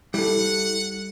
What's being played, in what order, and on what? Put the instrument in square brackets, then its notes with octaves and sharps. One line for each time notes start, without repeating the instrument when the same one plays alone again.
[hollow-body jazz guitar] G3 [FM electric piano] E4 A4 [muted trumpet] F#5